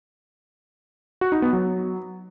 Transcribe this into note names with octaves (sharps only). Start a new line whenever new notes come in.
F#4
D#4
B3
F#3